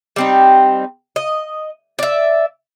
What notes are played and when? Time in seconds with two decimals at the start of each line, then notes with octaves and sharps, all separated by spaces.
0.16 G3 C4 D#4
1.16 D#5
1.99 D5 E5